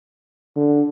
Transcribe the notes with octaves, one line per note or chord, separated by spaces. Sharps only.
D3